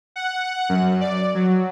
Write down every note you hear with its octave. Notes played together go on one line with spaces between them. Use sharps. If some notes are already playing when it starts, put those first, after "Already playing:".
F#5
F#2
D5
F#3